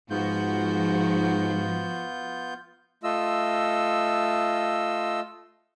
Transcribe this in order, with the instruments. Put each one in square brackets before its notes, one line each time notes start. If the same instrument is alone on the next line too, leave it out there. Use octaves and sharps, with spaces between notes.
[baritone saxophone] G#2 [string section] F3 F#4 [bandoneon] B3 F4 G6
[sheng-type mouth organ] A3 F4 D#5 E6